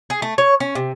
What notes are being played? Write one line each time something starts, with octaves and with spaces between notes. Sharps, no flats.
G#4
A3
C#5
C#4
C3